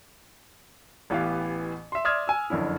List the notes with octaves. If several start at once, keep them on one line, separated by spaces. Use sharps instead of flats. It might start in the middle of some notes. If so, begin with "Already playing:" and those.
A1 E3 B3 G4 F5
E5 C6
D5 E5 C6 D#6 F6 G#6
G#5 E6
F#1 F2 D3 C#4 E4